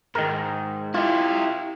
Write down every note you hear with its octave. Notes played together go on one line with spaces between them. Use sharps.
G#2 D#3 A#4
E4 F4 G4